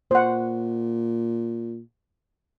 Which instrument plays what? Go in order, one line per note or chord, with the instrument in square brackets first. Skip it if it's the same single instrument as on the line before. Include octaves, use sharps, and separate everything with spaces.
[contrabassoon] A#2 [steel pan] C5 F#5